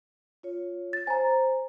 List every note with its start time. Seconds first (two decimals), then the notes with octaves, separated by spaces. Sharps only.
0.43 F4 C#5
0.93 A6
1.07 C5 G#5 A#5